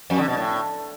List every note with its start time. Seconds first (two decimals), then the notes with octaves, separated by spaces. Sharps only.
0.10 F2
0.19 D3
0.28 B2
0.37 A2